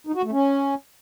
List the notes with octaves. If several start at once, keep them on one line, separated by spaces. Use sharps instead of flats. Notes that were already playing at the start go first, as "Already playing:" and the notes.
D#4
F#4
A3
C#4